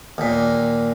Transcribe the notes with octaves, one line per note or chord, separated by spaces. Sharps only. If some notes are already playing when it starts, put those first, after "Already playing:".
D#2 A#2